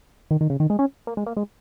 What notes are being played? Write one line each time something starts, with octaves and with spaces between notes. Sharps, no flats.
D#3
D#3
C#3
D#3
G#3
C#4
A#3
G#3
A#3
G#3